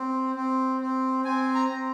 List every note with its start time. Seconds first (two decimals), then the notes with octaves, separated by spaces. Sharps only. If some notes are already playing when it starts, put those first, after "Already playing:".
Already playing: C4
0.35 C4
0.81 C4
1.25 C4 G#5
1.54 A#5
1.69 C4